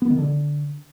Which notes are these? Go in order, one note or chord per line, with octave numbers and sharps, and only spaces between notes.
B3
D#3
D3